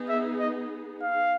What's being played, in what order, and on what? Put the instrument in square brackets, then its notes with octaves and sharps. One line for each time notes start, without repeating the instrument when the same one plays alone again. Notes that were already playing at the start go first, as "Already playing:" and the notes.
Already playing: [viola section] B3 D#4 G#4
[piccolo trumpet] E5
D#5
F5